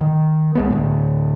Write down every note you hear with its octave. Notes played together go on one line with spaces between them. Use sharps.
D#3
C2 G#3 B3
D2 A2